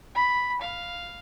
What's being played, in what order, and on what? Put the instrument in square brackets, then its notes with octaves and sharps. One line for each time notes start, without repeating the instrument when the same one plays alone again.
[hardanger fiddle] B5
F5